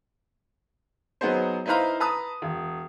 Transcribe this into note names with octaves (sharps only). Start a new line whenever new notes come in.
F#3 B3 D#4 G#4 C5
D#4 E4 B4 C5 F5 A#5
B4 A5 A#5 D#6
E1